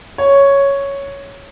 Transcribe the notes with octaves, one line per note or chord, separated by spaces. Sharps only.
C#5